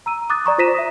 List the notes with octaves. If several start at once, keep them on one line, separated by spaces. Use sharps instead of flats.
A#5 E6 D#7
D6 D#6 F#6 A6
D5 A#5 C#6 D#6
F4 C5 A#6 B6 D#7 E7
E5 D#6